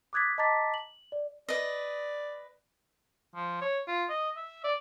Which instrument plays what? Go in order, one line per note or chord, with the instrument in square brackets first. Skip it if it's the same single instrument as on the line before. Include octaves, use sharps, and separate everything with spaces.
[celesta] D6 D#6 F#6 G#6 A6 B6
D#5 A5 A#5 D6 A6 B6
F#7
D5
[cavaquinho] B4 D#5 [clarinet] D5
[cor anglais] F3
C#5
F4
D#5
E5
D5